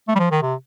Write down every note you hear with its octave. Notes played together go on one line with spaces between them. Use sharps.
A3
G3
F3
D#3
C3